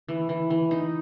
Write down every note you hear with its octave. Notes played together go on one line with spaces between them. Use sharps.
E3
E3
E3
D#4